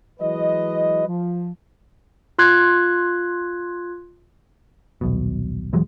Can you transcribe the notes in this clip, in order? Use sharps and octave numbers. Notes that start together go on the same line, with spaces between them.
E3 F#3 G#3 B4 D#5
F3
F4 C6 F#6 G#6
D#1 B1 B2
D#1 E3 F#3 G#3